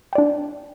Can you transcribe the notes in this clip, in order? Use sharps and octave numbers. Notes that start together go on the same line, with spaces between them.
D4 D5 G5